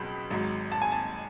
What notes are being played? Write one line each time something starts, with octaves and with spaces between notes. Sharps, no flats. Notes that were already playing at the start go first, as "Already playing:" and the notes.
Already playing: C#2 B2 F#3 B5
G#1 G#2 F#3
A5
G#5
A5